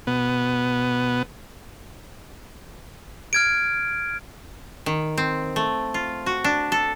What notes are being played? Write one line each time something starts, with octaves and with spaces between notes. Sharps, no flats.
B2 B3
F6 G#6 D7
D#3
C4
A3
F4
F#4
D4
A4